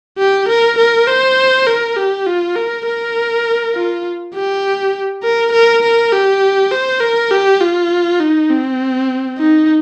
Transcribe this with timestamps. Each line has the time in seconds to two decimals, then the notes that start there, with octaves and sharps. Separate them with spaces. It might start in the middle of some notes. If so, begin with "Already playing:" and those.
0.19 G4
0.49 A#4
0.78 A#4
1.08 C5
1.67 A#4
1.96 G4
2.26 F4
2.56 A#4
2.86 A#4
3.75 F4
4.35 G4
5.23 A#4
5.53 A#4
5.83 A#4
6.12 G4
6.71 C5
7.01 A#4
7.31 G4
7.61 F4
8.20 D#4
8.50 C4
9.38 D#4